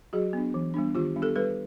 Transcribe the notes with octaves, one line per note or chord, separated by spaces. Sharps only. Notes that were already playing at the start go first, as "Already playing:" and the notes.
F#3 F#4 G#4
B3 D4
E3
G3 B3 D4
D#3 F4 G4
G3 B3 D4
G4 A4
G3 A4 B4